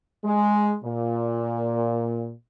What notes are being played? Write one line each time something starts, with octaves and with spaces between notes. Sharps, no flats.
G#3
A#2